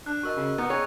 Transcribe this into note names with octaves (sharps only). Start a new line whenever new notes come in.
D4 F#6
F#4 A#4 D#5 C#6 E6
C#3
B3 D#4
G#4 C#5 G5 G#5 C#6